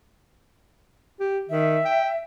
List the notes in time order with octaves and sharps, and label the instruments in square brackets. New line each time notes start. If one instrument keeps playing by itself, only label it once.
[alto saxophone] G4
[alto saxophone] D#3 [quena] E5
[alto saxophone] G5